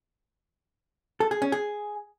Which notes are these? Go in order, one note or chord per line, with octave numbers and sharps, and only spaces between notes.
A4
G#4
C#4
G#4